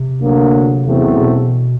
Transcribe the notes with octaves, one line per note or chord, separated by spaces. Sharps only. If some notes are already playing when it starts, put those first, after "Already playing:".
Already playing: C3
D2 D3 F#3 A#3
E2 C#3 F#3 A3 C4
B2